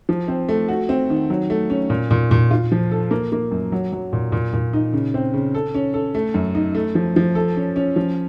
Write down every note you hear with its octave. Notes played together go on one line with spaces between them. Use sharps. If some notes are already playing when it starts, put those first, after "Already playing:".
F3
C4
A3
F#4
C4
D#3
F#3
A3
C#4
A#2
A#2
A#2
F4
F3
A4
A#3
A#3
F#2
F#3
F#3
A#2
A#2
A#2
D#4
C#3
C4
C#3
A4
C#4
A4
A3
F#2
D#4
A3
F3
F3
A4
C#4
C#4
F3